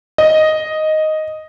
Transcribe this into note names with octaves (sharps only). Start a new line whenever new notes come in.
D#5